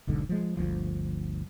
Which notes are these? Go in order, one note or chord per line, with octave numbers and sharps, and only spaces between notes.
E1 B1 G#2 D3
F3 G#3
G1 D2 F3